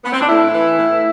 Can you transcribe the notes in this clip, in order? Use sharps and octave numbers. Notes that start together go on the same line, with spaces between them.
B3
C4
D4
A2 E4
E3
A2